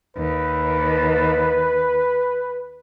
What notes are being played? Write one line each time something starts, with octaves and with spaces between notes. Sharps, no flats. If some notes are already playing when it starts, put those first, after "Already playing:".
D#2 B4